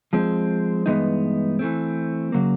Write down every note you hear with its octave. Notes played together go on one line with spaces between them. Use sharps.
F3 G#3 C4
G2 E3 G#3 B3 D#4
E3 A3 C4
C#3 F#3 A#3